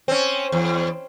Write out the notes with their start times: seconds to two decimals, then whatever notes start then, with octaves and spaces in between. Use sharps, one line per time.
0.08 C4 C#4
0.52 E2